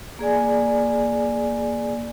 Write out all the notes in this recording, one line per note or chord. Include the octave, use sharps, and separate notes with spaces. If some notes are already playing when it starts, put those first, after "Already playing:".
A#3 G#4 D5 G#5